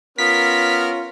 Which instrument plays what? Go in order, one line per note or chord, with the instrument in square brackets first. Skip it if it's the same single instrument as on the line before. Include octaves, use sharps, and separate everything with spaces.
[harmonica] B3 A#4 [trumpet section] C#4 F4 [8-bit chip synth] B6